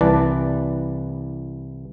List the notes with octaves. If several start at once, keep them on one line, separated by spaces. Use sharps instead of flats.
C2 E3 B4 D5 A5